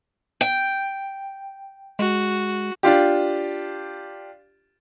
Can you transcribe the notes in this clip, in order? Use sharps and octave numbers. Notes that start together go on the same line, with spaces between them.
G5
G#3 F#4
D4 F4 G4